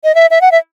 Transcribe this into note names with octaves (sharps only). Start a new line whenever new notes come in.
D#5
E5
E5
F#5
E5